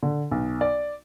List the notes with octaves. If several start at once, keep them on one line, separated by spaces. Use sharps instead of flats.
D3
B1
D5